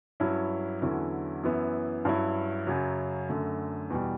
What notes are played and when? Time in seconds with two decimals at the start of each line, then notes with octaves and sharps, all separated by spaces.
0.20 G2 F#3 C#4 E4
0.82 E2 D3 F#3 C#4 E4
1.43 F#2 E3 B3 E4
2.05 G2 F#3 C#4 E4
2.67 F#2 C#3 F#3
3.29 F#2 D3 A3
3.90 E2 B2 G3